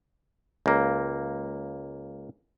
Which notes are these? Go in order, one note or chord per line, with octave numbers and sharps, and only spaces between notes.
C#2 A#3